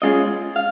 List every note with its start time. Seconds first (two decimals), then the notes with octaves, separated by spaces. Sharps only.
0.02 G#3 C#4 F4 G#4 D#5
0.56 F5